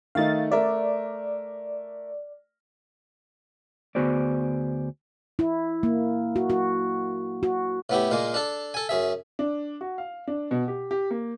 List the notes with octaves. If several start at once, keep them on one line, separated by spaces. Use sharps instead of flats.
D#3 A3 D#4 F5 A6
A3 A#4 D5 E5
D2 B3 F#4 G#4 C5 D5
E4
A#3
F#4
F#4
F#4
A2 B3 E4 G4
A#2 G#3 A#3
D4 A4
A4 G#5
F#2 G#4 E5
D4
F#4
F5
D4
B2
G4
G4
A#3